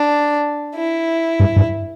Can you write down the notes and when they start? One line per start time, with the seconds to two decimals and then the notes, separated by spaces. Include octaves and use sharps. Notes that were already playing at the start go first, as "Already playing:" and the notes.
Already playing: D4
0.75 E4
1.40 G2
1.56 G2